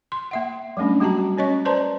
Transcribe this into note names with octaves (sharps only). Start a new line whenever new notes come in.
C6
A#3 E5 F#5
F#3 G3 A3 C#4 D4
G3 A#3 F#4 G4 A5 A#5
C#4 C#5 D#5 C#6
B4 C5 D5 A5 A#5 C6